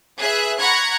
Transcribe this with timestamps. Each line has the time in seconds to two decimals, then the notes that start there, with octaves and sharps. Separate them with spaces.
0.17 G#4 B4 E5 F#6
0.58 F#5 A#5 B5 C#6 F#6 G#6